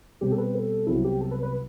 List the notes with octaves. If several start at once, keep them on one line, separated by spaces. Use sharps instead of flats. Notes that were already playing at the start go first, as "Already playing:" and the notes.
B2 G3 C4 G4
A4
B4
A4
C2 C3 F#3 B3 E4 F#4
G4
A4
B4
B4